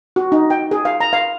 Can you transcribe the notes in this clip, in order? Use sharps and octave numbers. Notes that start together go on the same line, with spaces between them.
F#4
D#4
G5
G#4
F5
A#5
F5